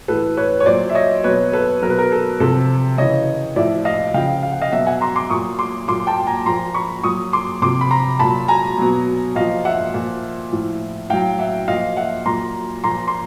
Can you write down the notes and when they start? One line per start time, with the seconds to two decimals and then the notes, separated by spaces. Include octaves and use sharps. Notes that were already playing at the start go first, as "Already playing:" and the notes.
0.08 A2 E3 A4 B4
0.37 B4 C#5
0.60 C#5
0.66 A#2 F#3 C5 D5
0.90 E5
0.95 C#5 D#5
1.24 B2 F#3 B4 C#5
1.53 A4 B4
1.82 B2 F#3 A#4
1.90 B4
1.98 A#4
2.12 A4
2.40 C3 F3 A4
2.98 C#3 E3 C#5 D#5
3.56 A2 F3 D5 E5
3.85 D#5 F5
4.14 C#3 F3 F5 G5
4.43 F5
4.52 F#5
4.61 D#5 F5
4.72 B2 F#3 E5 F#5
4.87 F#5 G#5
5.01 A#5 C6
5.16 C6 D6
5.30 A#2 F#3 C#6 D#6
5.59 C6 D6
5.88 A#2 F#3 C6 D6
6.07 G5 A5
6.27 G#5 A#5
6.46 A#2 F3 A#5 C6
6.74 B5 C#6
7.03 A#2 F#3 C#6 D#6
7.33 C6 D6
7.62 C3 F3 C6 D6
7.81 B5
7.91 A#5 C6
8.19 A#2 F#3 A5 B5
8.48 G#5 A#5
8.78 B2 F#3
9.35 A#2 F3 D#5 F5
9.65 E5 F#5
9.94 A#2 F3
10.52 A2 F3
11.10 A2 F#3 F5 G5
11.39 E5 F#5
11.68 A#2 F3 D#5 F5
11.97 E5 F#5
12.26 A#2 F#3 A#5 C6
12.84 A#2 F3 A#5 C6
13.08 C6